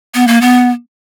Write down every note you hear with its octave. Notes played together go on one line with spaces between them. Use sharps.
B3
A#3
B3